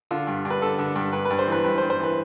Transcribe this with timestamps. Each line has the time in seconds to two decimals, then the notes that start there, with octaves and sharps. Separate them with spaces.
0.11 D3 F4
0.27 G2
0.45 G2
0.50 B4
0.61 D3 A4
0.79 D3
0.96 G2
1.13 G2 B4
1.25 B4
1.31 G2
1.39 C5
1.48 E3 B4
1.64 G2 B4
1.78 C5
1.82 G2
1.90 C5
1.99 E3 B4